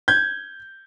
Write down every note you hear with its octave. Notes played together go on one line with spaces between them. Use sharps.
G6 G#6